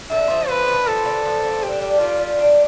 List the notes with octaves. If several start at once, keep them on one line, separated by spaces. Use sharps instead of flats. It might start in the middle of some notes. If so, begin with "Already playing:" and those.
D3 E5
F3
D3 B4
A3
F3 A4
D3
F3
D3
D4 G4
G3
G3 F4
G3
D4